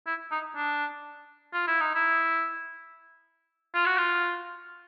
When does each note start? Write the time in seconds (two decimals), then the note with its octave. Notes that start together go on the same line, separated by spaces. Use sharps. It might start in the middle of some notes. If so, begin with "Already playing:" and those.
0.07 E4
0.31 D#4
0.56 D4
1.53 F4
1.67 E4
1.80 D#4
1.94 E4
3.74 F4
3.86 F#4
3.98 F4